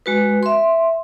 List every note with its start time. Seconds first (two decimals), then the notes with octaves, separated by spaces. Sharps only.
0.06 G#3 F#4 B4
0.43 E5 C6